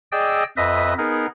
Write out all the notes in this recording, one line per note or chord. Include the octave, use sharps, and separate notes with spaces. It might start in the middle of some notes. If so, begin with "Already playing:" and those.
G#4 D5 D#5 G5 E6
F2 B4 D#5 E5 A#6
B3 D#4 G#4 A#4